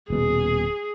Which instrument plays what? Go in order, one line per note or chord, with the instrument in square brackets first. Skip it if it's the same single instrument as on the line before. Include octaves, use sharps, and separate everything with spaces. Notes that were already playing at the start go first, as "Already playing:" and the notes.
[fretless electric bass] D#1 B2 [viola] G#4